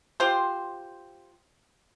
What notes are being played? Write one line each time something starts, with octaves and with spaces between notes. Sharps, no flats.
F4 G4 C5